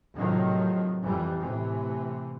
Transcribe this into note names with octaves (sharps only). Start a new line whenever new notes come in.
A2 C3 D#3 F3 F#3
F2 E3 G3
A2 C3 E3